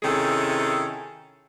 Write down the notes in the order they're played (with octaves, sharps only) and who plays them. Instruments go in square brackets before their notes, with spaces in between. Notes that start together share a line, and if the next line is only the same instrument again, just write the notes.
[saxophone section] C3 D#3 C#4 E4 G#4 A4